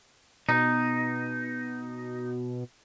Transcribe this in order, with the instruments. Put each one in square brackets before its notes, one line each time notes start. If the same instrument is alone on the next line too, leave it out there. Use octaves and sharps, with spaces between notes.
[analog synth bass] B2 [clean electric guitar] D#4